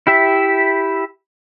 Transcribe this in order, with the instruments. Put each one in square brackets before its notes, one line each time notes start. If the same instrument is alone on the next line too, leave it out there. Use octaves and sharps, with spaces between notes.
[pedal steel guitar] E4 G4 E5